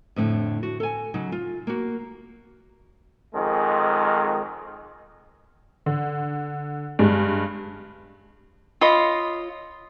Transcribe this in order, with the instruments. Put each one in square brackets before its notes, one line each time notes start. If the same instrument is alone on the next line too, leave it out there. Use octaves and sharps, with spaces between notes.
[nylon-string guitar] F2 A2 D3
F#4
A4 G#5
C#3 F#3 D#4
F4
A#3 F#4
[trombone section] F2 G#2 D#3 G#3
[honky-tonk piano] D3
G2 G#3
[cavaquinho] F4 C#5 D#5 B5